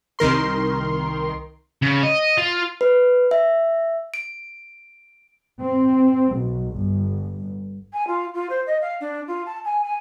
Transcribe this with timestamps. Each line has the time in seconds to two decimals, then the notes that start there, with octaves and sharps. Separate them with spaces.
0.19 C2 D#3 A#4 C6
1.82 C#3
2.03 D#5
2.38 F4
2.81 B4
3.31 E5
4.14 D7
5.60 C4
6.33 B1
6.75 G1
7.93 G#5
8.07 F4
8.34 F4
8.50 C5
8.67 D#5
8.82 F5
9.01 D4
9.28 F4
9.46 A5
9.65 G#5
9.84 G#5